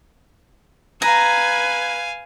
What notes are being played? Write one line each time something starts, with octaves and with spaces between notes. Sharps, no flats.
B4 F5 G#5 A#5 G#6